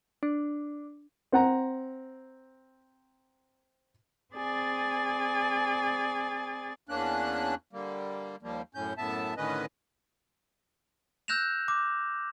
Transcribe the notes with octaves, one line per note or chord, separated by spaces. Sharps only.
D4
C4 F#5 A#5
C4 G#4 D5 G#5 A6
E2 A#3 C#4 D4 F#6
D3 G3 A#3
D#2 F3 G3 A#3
F#2 A2 C#4 G6
F#2 A2 B3 E5 A5
A2 D3 D#3 C#4 B4 D#5
E6 F#6 G6 A#6 E7 F7
D6